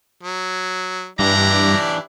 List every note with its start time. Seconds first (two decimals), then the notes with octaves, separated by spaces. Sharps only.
0.23 F#3
1.19 G2 E3 D4 E4 G4 D5 A#5